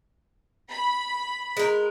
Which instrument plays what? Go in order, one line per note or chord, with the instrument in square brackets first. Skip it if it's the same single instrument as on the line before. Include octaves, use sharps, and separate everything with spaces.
[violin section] B5
[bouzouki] G#3 A#4